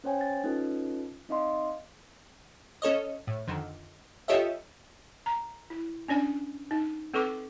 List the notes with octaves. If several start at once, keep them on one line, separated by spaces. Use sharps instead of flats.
C#4 C5 C#5 G5 G#5
A6
C#4 D#4 F4 A4 B4
C4 D#4 D5 D#5 F5 C6
C#4 A4 C#5 D#5
A2
F2 D3 D#3
F4 G4 A4 C#5 D#5 E5
A#5
E4
C#4 D4 D5 G#5
D#4
C4 A4 B4 C#6 D6